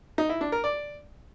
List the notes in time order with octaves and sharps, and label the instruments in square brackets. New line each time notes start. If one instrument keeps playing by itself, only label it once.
[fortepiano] D#4
E4
D4
A#4
D5